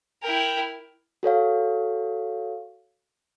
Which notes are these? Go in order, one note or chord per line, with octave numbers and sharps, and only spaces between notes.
E4 A#4 G5
F#4 A4 C#5 F5